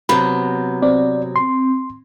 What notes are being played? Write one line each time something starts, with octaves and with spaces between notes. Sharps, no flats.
C3 F#3 B3 B5
C4 D5
C6